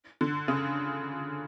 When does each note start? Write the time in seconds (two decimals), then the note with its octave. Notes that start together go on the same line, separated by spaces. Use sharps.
0.21 D3
0.48 C#3